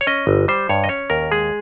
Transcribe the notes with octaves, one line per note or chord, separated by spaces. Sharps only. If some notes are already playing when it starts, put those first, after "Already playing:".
C#5
C#4 D#5
G1
G3 C5
G2 C#5
D#5
C#4 C#5
D#2 A#4
G#3 G#4